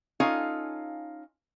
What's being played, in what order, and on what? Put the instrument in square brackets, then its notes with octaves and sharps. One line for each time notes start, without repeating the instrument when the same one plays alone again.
[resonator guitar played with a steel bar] C#4 D#4 F4 A4 F5 G#5